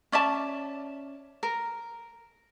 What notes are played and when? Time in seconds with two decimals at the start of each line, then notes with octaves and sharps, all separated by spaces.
0.12 C#4 D5 E5 A5
1.43 A#4